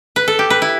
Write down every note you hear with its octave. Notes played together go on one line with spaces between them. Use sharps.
B4
A4
G4
B4
E4